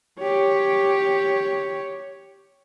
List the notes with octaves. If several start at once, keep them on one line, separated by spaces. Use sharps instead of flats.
G4 C#5